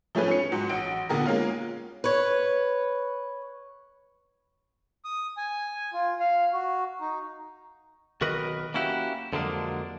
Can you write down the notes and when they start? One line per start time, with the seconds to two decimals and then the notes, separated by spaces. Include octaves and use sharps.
0.15 F3 A3 C#4 G#4 B4
0.28 C#4 C#7
0.52 G#2 F#3
0.69 A1 F#5 D7
1.09 A#2 D3 B3 G#4 A#4
1.26 G#3 A#3 C#4 F4
2.04 B4 C#5
5.05 D#6
5.37 G#5
5.93 F4
6.20 F5
6.53 F#4
7.00 D#4
8.21 B1 D#3 F#4 A#4 B4 D#5
8.74 A#3 C#4 E4 F#4 G4
9.33 F2 D3 F#3 G#3 A#3 D4